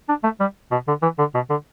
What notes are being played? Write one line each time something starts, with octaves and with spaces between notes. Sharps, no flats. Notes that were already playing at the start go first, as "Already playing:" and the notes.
D4
A3
G3
B2
D3
E3
D3
B2
D3